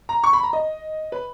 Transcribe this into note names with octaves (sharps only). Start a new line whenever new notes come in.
A#5
C#6
B5
A#5
D#5
B4